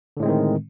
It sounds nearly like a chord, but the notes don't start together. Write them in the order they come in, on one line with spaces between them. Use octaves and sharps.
D3 A2 G#3 C4 D#3